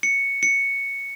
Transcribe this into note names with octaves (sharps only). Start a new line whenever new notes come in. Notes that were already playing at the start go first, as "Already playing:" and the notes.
C#7
C#7